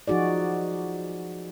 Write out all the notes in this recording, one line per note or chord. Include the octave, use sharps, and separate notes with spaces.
F3 D#4 F#4 G#4 D5